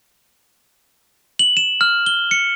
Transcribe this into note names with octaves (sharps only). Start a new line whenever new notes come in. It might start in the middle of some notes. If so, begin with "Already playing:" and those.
F#7
E7
F6
G7
C#7